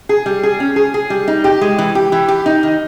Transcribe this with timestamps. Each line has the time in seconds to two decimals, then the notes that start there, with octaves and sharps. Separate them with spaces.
0.09 G#4
0.26 G3
0.43 G#4
0.60 C#4
0.76 G#4
0.94 G#4
1.10 G3
1.28 D#4
1.44 G4
1.61 G#3
1.78 E3
1.95 G4
2.12 E3
2.28 G4
2.46 D#4
2.63 D#3